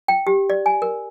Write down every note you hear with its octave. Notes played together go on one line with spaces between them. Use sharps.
G5
G4
D5
G#5
A#4